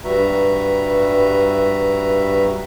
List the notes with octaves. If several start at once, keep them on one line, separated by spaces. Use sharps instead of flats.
G2 G3 F#4 B4 E5 A#5